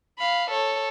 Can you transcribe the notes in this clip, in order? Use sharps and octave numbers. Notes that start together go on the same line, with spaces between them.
F5 B5
A4 C#5